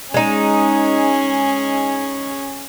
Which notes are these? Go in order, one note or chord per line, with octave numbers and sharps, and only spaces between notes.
G#3 C#4 D#4 G#4